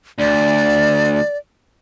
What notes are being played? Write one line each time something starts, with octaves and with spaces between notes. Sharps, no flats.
D2 D5